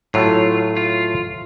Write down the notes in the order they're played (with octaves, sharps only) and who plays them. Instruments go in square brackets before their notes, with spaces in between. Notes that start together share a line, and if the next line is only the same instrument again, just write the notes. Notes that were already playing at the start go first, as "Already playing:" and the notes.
[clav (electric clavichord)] A2 F#3 A3 [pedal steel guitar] F4
[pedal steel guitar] F4